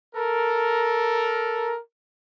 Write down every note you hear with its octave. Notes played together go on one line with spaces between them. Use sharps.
A4 A#4